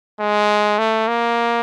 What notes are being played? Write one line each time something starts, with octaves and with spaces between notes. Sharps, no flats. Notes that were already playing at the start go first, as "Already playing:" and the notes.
G#3
A3
A#3